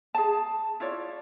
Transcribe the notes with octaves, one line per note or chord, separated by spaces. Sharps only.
G#4 A5
E4 F4 C#5 D5